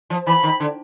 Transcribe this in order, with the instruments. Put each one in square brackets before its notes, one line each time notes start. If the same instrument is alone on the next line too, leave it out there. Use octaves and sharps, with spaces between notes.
[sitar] F3
[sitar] E3 [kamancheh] B5
[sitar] D#3
D3